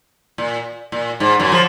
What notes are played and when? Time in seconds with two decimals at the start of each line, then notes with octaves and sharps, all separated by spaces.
0.38 A#2
0.92 A#2
1.20 G#2
1.40 F#2
1.52 F3